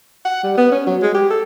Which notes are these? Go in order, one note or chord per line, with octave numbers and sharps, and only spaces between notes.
F#5
G3
B3
C#4
F#3
G#3
G4
A4